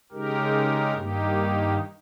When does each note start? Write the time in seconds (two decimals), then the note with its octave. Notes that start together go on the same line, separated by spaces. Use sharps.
0.12 C#3 G#3 D#4 G4 A#4
0.93 G2 D#3 A#3 D#4 G4